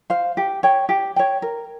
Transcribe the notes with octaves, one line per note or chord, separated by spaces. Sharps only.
C5 F5
G4
C#5 G5
G4
C#5 G5
A#4